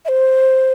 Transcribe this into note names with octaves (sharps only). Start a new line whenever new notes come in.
E5
C5